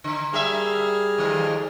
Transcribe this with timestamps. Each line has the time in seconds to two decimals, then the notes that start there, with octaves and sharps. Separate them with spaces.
0.04 D3
0.33 G3 A#3 G#4 E5 F6
1.18 F2 D#3